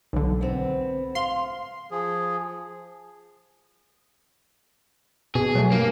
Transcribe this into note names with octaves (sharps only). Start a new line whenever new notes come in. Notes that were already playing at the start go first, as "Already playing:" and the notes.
B1 D3
B3 C4
F5 C6
F3 G#4
B2 G#4
F#3 A3
G2 A#3